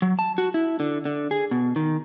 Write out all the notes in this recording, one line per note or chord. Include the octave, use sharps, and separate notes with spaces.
F#3
A5
F#4
E4
D3
D3
G#4
B2
D#3